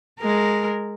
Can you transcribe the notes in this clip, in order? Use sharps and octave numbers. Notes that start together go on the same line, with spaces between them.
G#3 A#4